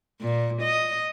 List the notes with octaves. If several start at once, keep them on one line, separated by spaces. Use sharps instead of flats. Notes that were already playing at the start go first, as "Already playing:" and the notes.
A#2
D#5